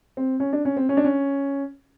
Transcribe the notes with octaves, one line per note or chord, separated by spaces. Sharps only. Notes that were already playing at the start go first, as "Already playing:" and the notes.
C4
C#4
D4
C#4
C4
C#4
D4
C#4